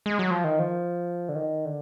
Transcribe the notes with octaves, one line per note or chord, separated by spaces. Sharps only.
G#3
F#3
F3
D#3
F3
D3
D#3
D3